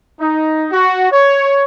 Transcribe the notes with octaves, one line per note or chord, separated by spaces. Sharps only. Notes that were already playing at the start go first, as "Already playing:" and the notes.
D#4
F#4
C#5